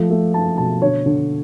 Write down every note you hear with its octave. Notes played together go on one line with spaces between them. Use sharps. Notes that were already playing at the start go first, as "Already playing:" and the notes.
Already playing: F3 A3
A3
A3 A5
B2 A5
D3 C#5
D3